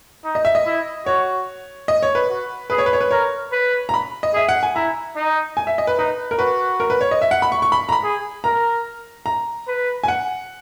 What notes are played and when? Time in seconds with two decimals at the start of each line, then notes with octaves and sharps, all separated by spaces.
0.24 D#4
0.35 D#5
0.45 E5
0.55 D#5
0.66 E4
1.06 F#4 C#5
1.88 D#5
2.03 C#5
2.15 B4
2.30 F#4
2.70 G#4 B4
2.78 C#5
2.86 B4
2.93 C#5
3.01 B4
3.11 A#4 C#5
3.52 B4
3.89 A#5
3.94 B5
4.23 D#5
4.34 G#4 E5
4.49 F#5
4.63 G#5
4.75 E4 A#5
5.16 D#4
5.57 G#5
5.67 E5
5.78 D#5
5.87 B4
5.98 D#4 B4
6.31 A#4
6.39 F#4 B4
6.80 A#4
6.90 B4
7.01 C#5
7.11 D#5
7.22 E5
7.31 F#5
7.42 B5
7.52 C#6
7.62 C#6
7.72 B5
7.89 A#5
7.92 B5
8.04 G#4
8.44 A#4 A#5
9.26 A#5
9.67 B4
10.03 G#5
10.08 F#5